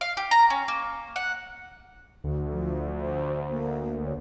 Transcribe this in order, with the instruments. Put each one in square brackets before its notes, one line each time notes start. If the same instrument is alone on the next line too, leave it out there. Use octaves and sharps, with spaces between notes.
[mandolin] F5
G4
A#5
C#4
A#3
F#5
[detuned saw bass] D2
[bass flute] F3
C5
A#3
C#5